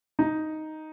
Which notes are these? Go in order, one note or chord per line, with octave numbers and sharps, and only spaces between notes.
D#4